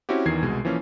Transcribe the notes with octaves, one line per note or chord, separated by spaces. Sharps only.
C4 C#4 E4 F#4 G4
E2 D#3 E3 G#6 C7
C2 B2 G#3
E3 F3 A#3 C#4